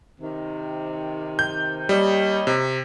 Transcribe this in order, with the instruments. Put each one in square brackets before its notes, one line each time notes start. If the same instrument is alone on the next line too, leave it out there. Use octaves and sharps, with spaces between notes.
[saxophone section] C3 D#3
[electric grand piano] G6
[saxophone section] D#2 C#5 D#5 [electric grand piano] G3
[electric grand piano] C3